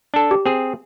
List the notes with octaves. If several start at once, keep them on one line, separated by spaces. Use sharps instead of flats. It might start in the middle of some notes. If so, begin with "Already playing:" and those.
D4 A4
G4
C4 G#4